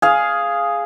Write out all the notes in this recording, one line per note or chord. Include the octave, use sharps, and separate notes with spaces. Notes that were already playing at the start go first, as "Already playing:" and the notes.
G#4 F5